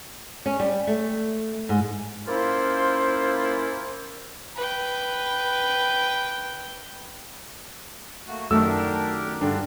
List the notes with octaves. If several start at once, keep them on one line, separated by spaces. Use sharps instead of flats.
C#4
G3
A3
G#2
A#3 C#4 E4 F4 C5
B4 G5
A3 A#3 F#4
F#2 D#3 A3 D4 G4 A#4 E6
G2 D3 D4